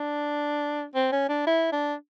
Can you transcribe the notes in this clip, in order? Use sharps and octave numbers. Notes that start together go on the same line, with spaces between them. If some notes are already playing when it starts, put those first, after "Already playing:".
Already playing: D4
C4
C#4
D4
E4
D4